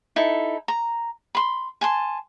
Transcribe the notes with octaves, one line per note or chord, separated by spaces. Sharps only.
D#4 E4 A4
A#5
B5 C6
G#5 A5 C6